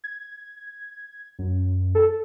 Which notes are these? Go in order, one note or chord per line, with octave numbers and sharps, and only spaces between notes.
G#6
F#2
A4